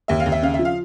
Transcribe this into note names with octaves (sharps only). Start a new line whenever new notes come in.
D#2 E5
F5
D#2
E5
C#3 F5
E5
F3
F5